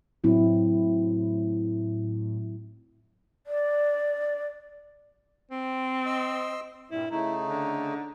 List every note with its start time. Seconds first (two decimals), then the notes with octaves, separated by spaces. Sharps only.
0.24 A2 F#3 C4 E4
3.47 D5
5.51 C4
6.06 D#5 C6 E6
6.91 G2 A#2 G3 E4
7.11 C#3 A3 D#4 E4
7.48 D3